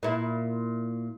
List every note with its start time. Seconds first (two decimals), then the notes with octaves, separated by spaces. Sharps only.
0.03 A#2 E4